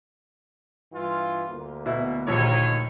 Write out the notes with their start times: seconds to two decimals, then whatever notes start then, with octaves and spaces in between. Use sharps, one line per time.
0.93 G2 E3 F4
1.49 D2 A#3
1.86 B2 E4
2.28 A#1 D#2 D#3 C#5